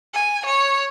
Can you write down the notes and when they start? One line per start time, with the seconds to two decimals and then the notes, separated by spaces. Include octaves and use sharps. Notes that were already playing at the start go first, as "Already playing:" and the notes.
0.13 G#5
0.45 C#5